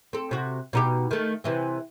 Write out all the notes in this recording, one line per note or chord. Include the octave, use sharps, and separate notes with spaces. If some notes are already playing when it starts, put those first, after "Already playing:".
C4 A4
C3 F#4
B2 D#4 G4
D#3 A3
C3 E3 C4